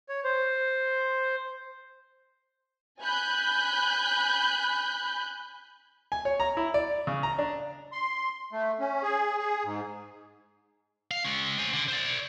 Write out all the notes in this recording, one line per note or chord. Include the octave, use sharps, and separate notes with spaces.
C#5
C5
G#5 B5 F#6 G6
G#5
C#5
A#5
E4
D5
C#3
A#5
D4
C6
A3
C#4
G#4
G#4
G#2
F5
G#3 C#4
C5 G#5
D3
C5 D5